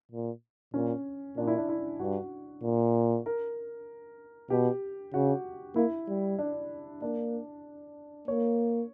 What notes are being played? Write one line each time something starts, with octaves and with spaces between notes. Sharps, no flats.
A#2
A#2 C#4
A#2 D4
E4
D4
E4
G2 F#4
A#2
A#4
B2 G4
C#3 F#4
A#3 E4
G3
D4
A#3 D4
A#3 C#5